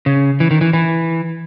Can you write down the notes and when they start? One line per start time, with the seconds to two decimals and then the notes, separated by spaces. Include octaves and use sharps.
0.06 C#3
0.40 E3
0.51 D#3
0.61 E3
0.73 E3